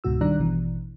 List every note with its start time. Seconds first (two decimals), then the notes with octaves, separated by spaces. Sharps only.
0.04 C#2 G#2 B2 F#4 E6
0.21 D#3 G3 D4 D5 A#5 F#6
0.38 A1 B2 E3